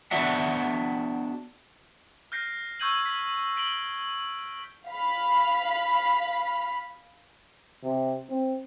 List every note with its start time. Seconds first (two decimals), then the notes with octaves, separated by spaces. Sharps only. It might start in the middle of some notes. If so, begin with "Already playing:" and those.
0.11 B3 D4 F#4 D5 E5 F#5
2.32 F6 G6 A#6 C7
2.80 C#6 E6 G6 G#6 D#7 F#7
3.06 B6
3.56 B6 D7 F#7 G7
4.87 F5 B5
7.83 C3
8.30 C4